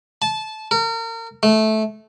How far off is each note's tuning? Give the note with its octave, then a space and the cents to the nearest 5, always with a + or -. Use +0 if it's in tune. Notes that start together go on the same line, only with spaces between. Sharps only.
A5 -20
A#4 -35
A3 -15